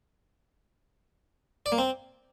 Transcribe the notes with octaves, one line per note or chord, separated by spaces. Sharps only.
D5
A#3
C4